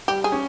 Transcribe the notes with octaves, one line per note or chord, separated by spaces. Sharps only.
G3 G4
G#4
C#4